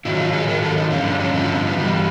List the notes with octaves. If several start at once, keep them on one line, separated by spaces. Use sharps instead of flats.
G#2 D#3 F#3 E4
F4
G#4
G#2 D#3 F#3 A#4
A4
D#4
G2 D3 F3 C#4
D4
C#4
G2 D3 F3 C4
C4
B3
B3
G2 E3 G3